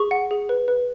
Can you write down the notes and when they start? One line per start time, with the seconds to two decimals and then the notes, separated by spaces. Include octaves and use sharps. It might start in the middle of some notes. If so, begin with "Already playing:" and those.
Already playing: G#4 C#6
0.11 F#5
0.31 G#4
0.49 B4
0.68 B4